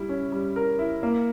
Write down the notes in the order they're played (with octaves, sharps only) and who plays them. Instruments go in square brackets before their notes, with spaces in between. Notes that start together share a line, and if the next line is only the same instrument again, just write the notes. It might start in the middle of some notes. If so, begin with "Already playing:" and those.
Already playing: [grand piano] G3 E4
C#4
G3
A#4
E4
A#3